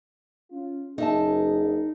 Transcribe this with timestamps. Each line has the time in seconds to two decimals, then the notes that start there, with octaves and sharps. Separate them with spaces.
0.51 C#4 F4
0.98 F#1 D#4 G#4 E5 A5